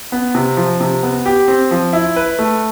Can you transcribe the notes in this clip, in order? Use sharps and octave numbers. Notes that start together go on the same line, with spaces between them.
B3
C3
F3
C3
B3
G4
C4
F3
E4
B4
A3